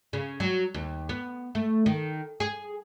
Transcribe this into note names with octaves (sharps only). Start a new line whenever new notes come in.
C#3
F#3
D#2
B3
A3
D#3
G#4